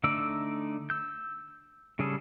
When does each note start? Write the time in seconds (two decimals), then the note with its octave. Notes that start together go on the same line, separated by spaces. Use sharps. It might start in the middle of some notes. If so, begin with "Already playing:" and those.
0.04 D3 A3 D#4 D5 E6
0.90 E6 G6
1.99 C#3 G3 C#4 G#4 A4